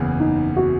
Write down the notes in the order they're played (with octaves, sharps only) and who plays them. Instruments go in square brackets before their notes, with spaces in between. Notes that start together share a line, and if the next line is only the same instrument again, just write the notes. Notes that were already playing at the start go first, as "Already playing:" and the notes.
Already playing: [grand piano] F#1 E2 C#3 E3
[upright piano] D#4
F#4